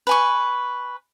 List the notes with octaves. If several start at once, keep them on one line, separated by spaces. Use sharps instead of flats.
B4 G#5 C#6